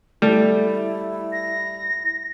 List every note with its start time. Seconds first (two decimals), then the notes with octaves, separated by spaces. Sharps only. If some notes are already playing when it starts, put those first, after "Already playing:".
0.22 G3 A3 E4
1.33 A#6